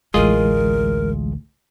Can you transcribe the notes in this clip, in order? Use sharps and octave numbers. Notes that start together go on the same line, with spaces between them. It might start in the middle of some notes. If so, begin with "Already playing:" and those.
A1 D2 E3 G#3 F4 G#4 A#4 D#5